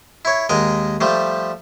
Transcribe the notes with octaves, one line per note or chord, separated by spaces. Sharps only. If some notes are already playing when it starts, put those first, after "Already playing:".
E4 C#5
D#2 G#3 A#4 D#5
F3 G3 A3